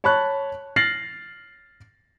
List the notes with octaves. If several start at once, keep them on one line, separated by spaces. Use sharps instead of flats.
C#5 A5 B5 C#6 F#6
F6 A6 A#6 C7 F#7